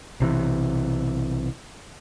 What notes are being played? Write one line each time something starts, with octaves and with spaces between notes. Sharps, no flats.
B1 C3 E3